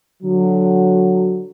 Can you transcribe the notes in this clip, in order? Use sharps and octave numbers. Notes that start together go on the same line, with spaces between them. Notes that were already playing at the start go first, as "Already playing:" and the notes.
D3 F#3